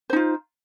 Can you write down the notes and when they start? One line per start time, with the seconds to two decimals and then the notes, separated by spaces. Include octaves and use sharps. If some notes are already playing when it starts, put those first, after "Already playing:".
0.10 C5
0.13 D#4
0.16 F4